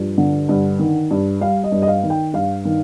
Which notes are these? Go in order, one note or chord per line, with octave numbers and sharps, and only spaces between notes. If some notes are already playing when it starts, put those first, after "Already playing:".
Already playing: G2 F3
D3
G2
D#3
G2
G3 F5
D#5
G2
D#5
F5
D#3
G5
G2 F5
D#3